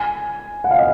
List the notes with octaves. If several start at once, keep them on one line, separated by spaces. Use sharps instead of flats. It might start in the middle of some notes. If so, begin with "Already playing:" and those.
Already playing: G#5
F#5
F5
D#5